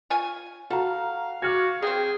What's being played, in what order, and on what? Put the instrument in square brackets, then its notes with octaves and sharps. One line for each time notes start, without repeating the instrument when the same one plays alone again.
[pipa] F4 C#5 G#5
[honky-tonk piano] F#4 A#5 [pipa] A4 [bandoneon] F5
[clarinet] F#4 [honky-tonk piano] D6 F6 G#6
[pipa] F#3 C4 [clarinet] G#4 [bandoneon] G5